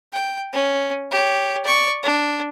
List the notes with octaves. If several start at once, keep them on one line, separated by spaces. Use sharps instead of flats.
G5
C#4
G4 C#5
D5 C#6
D4